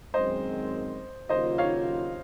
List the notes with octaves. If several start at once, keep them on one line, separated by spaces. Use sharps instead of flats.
F#2 D#3 G#3 C4 C5 D#5
D#2 C#3 F#3 A#3 F4 C5 D#5
C#5 F5